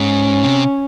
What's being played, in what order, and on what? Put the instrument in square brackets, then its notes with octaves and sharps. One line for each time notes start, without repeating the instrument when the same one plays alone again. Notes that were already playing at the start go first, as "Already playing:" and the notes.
Already playing: [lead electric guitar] G#2 [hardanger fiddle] C#4
[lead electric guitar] C3